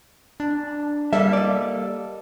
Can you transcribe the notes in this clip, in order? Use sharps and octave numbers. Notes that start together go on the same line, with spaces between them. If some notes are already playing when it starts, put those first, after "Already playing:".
D4
G3 A#3 A4 E5
D5 D#5